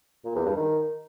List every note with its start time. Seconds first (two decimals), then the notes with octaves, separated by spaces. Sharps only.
0.25 A#2
0.35 E2
0.46 G2
0.56 D#3